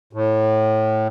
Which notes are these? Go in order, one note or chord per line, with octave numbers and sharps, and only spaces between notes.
A2